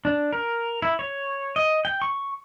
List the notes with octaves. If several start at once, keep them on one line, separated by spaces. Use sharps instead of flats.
D4
A#4
E4
C#5
D#5
G5
C#6